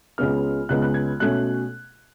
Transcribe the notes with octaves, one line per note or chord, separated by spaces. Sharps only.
C#2 C#3 G#3 B3 F6
C#2 C#3 G#3 B3 F#6
F#6
G#6
B2 A3 C#4 F#6